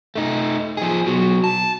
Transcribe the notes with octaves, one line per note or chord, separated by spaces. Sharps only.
A3 D#4
F3 G#4
B2 F#3
A5